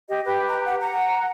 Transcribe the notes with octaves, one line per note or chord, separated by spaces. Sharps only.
G4 D#5
G4 B4 G5
A#5
F#5
F#5 A#5